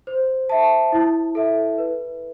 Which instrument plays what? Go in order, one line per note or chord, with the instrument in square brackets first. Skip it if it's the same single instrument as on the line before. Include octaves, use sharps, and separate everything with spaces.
[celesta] C5
E5 A5
E4
A4 E5
B4